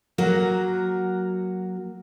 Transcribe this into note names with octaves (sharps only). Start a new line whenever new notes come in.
F#3 A#3 F#4 A#4 C#5